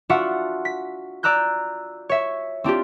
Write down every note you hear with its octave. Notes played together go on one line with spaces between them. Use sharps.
D4 F4 F#4 E5 F#5
B6
D5 A#5 E6 F#6 G6
C#5 E5
C4 D4 F4 G4